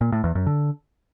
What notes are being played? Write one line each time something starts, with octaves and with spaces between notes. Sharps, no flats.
A#2
A2
E2
F#2
D3